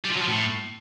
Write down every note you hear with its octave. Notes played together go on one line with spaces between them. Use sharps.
G3
F3
F#3
F3
A2